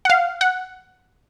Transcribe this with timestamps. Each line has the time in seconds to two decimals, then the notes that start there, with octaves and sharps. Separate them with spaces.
0.05 F#5
0.10 F5
0.41 F#5